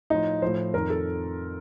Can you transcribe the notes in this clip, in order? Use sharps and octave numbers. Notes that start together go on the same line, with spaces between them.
A2 F3 D#4
A2 F3 C5
F2 D#3 A#4
A4